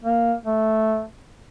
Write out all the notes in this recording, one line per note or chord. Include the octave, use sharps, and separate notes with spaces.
A#3
A3